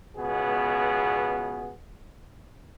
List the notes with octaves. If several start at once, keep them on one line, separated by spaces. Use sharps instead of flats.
C#2 B2 B3 G#4